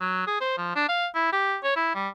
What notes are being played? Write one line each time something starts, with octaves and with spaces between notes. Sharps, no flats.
F#3
G#4
C5
F3
D4
F5
E4
G4
C#5
E4
G3